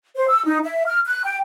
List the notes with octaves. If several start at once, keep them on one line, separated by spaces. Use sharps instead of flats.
C5
E6
D#4
E5
F6
F#6
G5